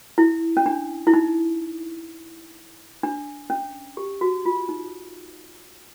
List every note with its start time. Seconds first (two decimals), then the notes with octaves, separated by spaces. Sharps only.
0.18 E4
0.57 C#4
0.66 D4
1.07 E4
1.14 D#4
3.03 D4
3.50 C#4
3.97 G4
4.21 F#4
4.45 F4
4.69 D#4